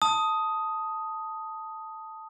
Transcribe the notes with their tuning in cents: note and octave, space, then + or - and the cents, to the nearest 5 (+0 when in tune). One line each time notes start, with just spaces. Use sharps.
A5 +5 D#6 +5